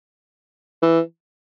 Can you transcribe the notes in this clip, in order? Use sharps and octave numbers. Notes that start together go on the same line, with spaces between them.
E3